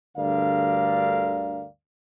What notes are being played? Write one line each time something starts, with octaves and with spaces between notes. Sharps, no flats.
D2 G2 D3 A#4 D5 F5